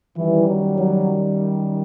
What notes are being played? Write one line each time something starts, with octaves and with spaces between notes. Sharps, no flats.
F#2 D#3 E3 G3
F#3
F#3